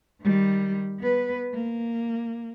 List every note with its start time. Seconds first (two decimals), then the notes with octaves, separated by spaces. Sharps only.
0.22 D#3 G3
1.00 B3 B4
1.54 A#3